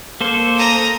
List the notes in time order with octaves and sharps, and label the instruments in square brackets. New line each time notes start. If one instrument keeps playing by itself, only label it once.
[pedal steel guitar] A#3 A4 C5
[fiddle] A#5 D#6